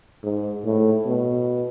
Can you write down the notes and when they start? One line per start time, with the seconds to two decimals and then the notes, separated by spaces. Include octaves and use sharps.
0.23 G#2
0.65 A2
1.06 B2